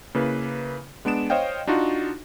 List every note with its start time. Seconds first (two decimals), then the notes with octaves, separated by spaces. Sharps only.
0.15 C#3 A#3 E4 B4
1.05 G#3 B3 D4 D7 E7
1.30 C5 C#5 D#5 F5 G5
1.67 D4 D#4 F4 F#4